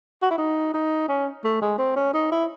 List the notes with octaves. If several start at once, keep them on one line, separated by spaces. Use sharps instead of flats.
F#4
E4
D#4
D#4
C#4
A3
G#3
C4
C#4
D#4
E4